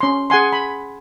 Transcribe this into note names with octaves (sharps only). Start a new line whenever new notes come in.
C#4 C6
G#4 F#5 G#5 C6
B5